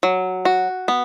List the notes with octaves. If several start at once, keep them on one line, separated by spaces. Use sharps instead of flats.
F#3
F#4
B3